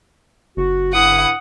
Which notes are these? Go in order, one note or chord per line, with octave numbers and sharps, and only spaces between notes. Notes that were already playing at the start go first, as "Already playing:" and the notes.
F#1 F#4
G2 C#3 E4 F#5 D#6